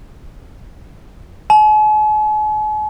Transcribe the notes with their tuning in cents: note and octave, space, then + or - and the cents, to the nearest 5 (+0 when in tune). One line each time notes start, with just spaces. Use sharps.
G#5 +45